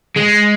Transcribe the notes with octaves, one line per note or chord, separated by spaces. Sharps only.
G#3